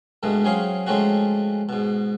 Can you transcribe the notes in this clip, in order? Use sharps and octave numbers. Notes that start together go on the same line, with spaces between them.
G2 B2 G#3 A3
F#3 C4 C#4 G#4 F5
F3 G#3 A3 C4 C#4 F#4
G#2 B2